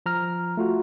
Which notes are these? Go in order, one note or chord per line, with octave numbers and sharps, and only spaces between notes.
F3 A#5 F6
A3 F4 F#4